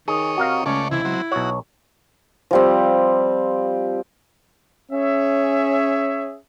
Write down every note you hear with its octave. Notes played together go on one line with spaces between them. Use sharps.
D#3 G#4 C#5 D#5
C3 F#4 A#4 F5
C#2 A3 C#4 C#5 D5
C3 E3 E4
F#3 C4
B1 F#4 C#5
F3 G3 C4
C#4 G#4 C#5 E5